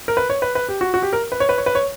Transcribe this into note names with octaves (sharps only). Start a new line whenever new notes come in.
A#4
B4
C#5
B4
B4
G4
F#4
F#4
G4
A#4
B4
C#5
B4
C#5
B4
C#5